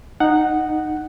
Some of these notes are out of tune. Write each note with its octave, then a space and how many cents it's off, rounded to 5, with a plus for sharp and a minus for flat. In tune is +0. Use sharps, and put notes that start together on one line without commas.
D#4 -10 F#5 +0